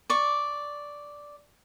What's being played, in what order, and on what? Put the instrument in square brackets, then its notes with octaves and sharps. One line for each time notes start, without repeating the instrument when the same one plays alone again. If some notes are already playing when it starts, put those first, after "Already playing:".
[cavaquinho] D5 C#6